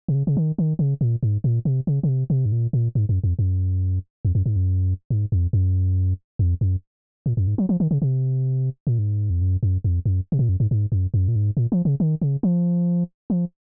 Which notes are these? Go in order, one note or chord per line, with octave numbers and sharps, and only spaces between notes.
C3
C#3
C#3
D#3
D#3
C#3
A#2
G#2
A#2
C3
C#3
C#3
C3
C3
G#2
A#2
A#2
G#2
F#2
F2
F#2
F2
F#2
G#2
F#2
G#2
F2
F#2
F2
F#2
A#2
F#2
G#2
F#3
F3
D#3
C#3
C3
A#2
G#2
F2
F#2
F#2
F2
F#2
C3
A#2
F#2
G#2
G#2
F#2
F#2
A#2
G#2
A#2
F3
C#3
D#3
C#3
F3
F3